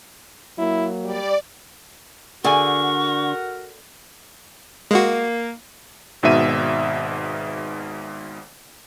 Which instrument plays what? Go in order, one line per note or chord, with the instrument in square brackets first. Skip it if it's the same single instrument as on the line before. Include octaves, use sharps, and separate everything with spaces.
[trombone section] F#3 A#3 [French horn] E4
[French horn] G3 [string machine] D5
[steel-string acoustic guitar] D3 [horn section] F#4 A#4 F#5 [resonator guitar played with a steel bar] G#4 D5 G#5 [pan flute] C#6
[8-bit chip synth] G#3 F#4 [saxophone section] A#3
[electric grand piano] G#1 G#2 B2 E5 D#7